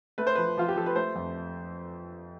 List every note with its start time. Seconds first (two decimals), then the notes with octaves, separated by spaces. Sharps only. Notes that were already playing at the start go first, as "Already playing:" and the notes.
0.18 A3 B4
0.27 C5
0.35 F3 B4
0.57 F3 F4
0.68 G4
0.76 F3 A4
0.86 B4
0.95 A3 C5
1.15 F2